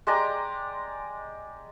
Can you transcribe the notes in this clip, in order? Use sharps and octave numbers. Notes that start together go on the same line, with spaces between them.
G#3 G4 D5 A#5